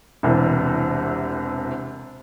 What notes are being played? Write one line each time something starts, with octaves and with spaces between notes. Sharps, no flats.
E1 C2 C3 E3